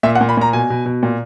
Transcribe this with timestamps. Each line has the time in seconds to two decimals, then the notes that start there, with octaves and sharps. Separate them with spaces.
0.03 A#2 E5
0.15 F#5
0.21 A#2
0.29 B5
0.37 A#2 A#5
0.53 B2 G#5
0.70 B2
0.86 B2
1.03 A#2